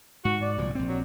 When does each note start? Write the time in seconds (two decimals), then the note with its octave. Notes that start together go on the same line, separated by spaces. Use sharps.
0.25 G#2 F#4
0.42 D5
0.58 C2 A#2 F3
0.75 A#1 C4
0.88 F#3